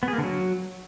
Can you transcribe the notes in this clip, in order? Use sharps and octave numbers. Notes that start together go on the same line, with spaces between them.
B3
G#4
A#3
D3
F#3